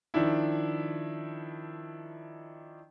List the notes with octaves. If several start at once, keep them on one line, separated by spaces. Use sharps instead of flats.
D#3 F3 D4 E4